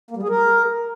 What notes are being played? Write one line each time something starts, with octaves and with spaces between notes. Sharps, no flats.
A#3
G3
G#4
A#4